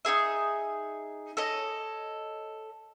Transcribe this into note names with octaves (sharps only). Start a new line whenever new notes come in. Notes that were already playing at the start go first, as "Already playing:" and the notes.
D#4 F4 G#4 E5
A4 C#5 D#5